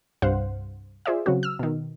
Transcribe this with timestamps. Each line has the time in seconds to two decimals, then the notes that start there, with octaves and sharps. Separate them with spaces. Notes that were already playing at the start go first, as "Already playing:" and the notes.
0.22 C2 G2 C5 F5 F#5
1.06 F4 G#4 C5 D5 E5
1.26 C#3 F#3 C4 F#4
1.43 E6 F6
1.59 B2 D#3